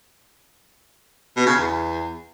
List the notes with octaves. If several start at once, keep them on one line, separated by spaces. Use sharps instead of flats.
B2
C#3
E2